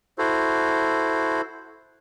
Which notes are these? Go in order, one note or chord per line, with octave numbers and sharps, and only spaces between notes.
E4 F#4 A4 C5